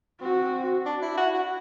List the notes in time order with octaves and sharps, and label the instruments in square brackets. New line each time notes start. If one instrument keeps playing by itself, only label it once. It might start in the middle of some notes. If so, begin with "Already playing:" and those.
[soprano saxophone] C4 [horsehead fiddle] F#4
[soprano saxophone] D4
E4
F#4
F#4